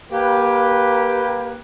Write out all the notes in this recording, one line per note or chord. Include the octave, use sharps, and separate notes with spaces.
A#3 G4 B4